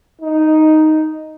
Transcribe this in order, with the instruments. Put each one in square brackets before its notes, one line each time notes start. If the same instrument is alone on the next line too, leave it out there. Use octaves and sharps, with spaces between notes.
[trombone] D#4